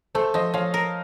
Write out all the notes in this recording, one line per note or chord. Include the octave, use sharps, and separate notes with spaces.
A3 A4 C5
F3 C5 D#5
F3 C#5 F5
A#4